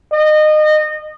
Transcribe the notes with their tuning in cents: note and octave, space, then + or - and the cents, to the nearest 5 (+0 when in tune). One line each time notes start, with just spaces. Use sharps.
D#5 -25